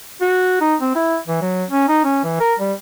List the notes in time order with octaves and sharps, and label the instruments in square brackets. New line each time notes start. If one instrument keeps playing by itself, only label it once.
[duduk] F#4
D#4
C4
E4
E3
F#3
C#4
D#4
C#4
E3
A#4
G3